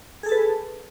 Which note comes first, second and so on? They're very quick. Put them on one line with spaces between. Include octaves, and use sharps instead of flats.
G#4 A4 A5 B4